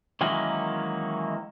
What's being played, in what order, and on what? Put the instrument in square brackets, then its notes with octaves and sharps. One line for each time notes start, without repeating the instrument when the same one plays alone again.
[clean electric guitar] D#3 E3 F#3 G#3 A#3 C#4